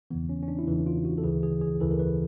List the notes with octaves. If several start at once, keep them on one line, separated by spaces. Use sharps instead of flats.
E2 C#3 E3 B3
C#4
C#4
D4
E4
E2 C#3 E3 D#4
F4
F#4
A4
D2 C#3 E3 G#4
G#4
G#4
D2 C#3 E3 A4
A#4
B4